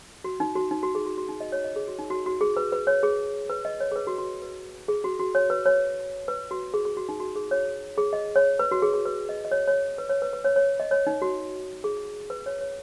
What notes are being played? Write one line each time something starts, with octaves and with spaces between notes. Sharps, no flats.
F#4
D#4
F#4
D#4
F#4
G#4
F#4
F#4
D#4
D#5
C#5
D#5
G#4
F#4
D#4
F#4
F#4
G#4
B4
B4
C#5
G#4
B4
D#5
C#5
G#4
B4
F#4
F#4
B4
G#4
F#4
F#4
C#5
B4
C#5
B4
F#4
G#4
G#4
F#4
D#4
F#4
G#4
C#5
G#4
D#5
C#5
B4
F#4
G#4
G#4
B4
D#5
D#5
C#5
C#5
B4
C#5
B4
B4
C#5
C#5
D#5
C#5
D#4
F#4
G#4
B4
C#5
C#5